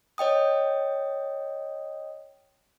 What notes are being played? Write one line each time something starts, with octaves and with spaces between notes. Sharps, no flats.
C#5 D#5 G5 D#6